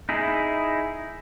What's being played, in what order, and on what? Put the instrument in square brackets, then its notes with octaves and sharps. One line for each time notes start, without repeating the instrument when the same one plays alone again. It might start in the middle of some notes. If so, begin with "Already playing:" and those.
[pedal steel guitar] D#4 E4 G#4